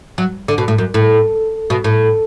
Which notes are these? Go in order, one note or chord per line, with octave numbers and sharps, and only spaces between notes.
F#3
D3
B2
A2
F#2
A2
B2
A2